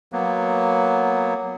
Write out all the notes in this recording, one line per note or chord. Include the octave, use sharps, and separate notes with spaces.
F#3 A#3 B3